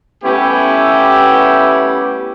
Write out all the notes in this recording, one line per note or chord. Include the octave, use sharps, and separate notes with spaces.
G3 A3 B3 C#4 E4 G4